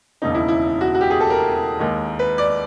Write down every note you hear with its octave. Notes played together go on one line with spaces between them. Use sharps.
E1 D#2 C#3 D#4
E4
E4
F#4
F#4
G4
G#4
A4
A#4
D#2 D#3 G#3
B4
D5